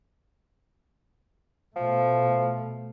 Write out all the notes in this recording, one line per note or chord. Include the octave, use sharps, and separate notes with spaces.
B2 F3 A3